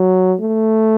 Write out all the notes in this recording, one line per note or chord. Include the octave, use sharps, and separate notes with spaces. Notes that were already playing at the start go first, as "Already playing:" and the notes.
Already playing: F#3
A3